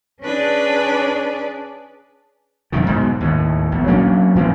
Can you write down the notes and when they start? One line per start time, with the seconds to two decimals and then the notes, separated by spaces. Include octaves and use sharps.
0.21 C#4 D4 G#4 B4 D5
2.72 A#1 F#2 C3 D#3
2.87 G#2 B2 D3
3.21 D#2 A2
3.72 A#1 E2
3.88 F#3 A#3 C#4 D4
4.35 A2 E3 A#3 C4